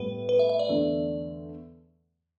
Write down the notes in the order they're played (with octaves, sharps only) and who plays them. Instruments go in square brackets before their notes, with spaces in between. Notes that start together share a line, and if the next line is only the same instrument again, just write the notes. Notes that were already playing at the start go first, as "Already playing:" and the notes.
Already playing: [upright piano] A2 G3 B3 [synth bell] B4
[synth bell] B4
E5
E5
D5
[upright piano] E2 D3 A3